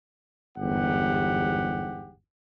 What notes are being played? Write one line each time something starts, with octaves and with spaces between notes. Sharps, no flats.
G1 E2 G#2 G4 F#5